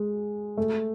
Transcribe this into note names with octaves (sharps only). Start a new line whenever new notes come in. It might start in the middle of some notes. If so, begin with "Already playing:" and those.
Already playing: G#3
A3